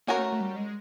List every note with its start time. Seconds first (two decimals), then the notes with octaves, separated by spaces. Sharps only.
0.07 A#3 C#4 F#4 A#4 C#5
0.16 A3
0.32 A3
0.40 G3
0.56 G#3